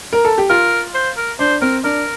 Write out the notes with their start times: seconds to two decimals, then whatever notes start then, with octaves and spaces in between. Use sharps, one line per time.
0.13 A#4
0.25 A4
0.38 G4
0.50 F4 A#4
0.94 C5
1.17 A#4
1.39 D4 C5
1.61 C4 A#4
1.83 D4 A#4